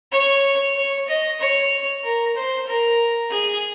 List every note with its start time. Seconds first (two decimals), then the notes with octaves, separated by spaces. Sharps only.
0.12 C#5
0.75 C#5
1.07 D#5
1.40 C#5
2.03 A#4
2.35 C5
2.67 A#4
3.31 G#4